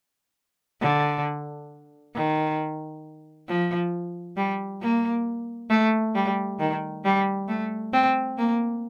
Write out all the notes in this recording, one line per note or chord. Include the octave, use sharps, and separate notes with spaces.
D3
D#3
F3
G3
A#3
A3
G3
D#3
G3
A3
C4
A#3